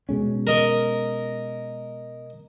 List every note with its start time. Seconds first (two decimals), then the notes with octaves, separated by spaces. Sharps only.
0.09 B2 G#3 C#4
0.47 A#4 D#5